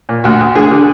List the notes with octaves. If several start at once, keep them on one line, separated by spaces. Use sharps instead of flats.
A#2
D2 F#4
D2
D3 G#4
D3